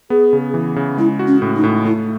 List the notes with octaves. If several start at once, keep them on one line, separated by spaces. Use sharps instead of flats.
B3 G#4
C#3
E3
C#3
G#3 E4
F#4
C#4
A2
D#4
A2
A3 E4